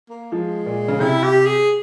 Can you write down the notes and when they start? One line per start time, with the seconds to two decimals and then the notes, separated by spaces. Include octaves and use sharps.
0.09 A#3
0.32 F3 G#3
0.66 A#2
0.88 C#3
1.00 C3 E4
1.23 G4
1.46 G#4